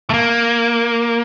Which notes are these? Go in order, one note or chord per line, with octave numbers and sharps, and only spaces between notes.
A3
A#3